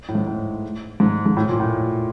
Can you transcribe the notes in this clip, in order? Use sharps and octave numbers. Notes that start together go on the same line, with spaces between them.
A2
G#2
A2
G#2
G#2
A2
A#2
A2